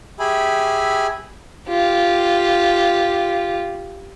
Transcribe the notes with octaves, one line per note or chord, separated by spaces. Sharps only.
G4 G#4 E5 G#5 B5
F4 G4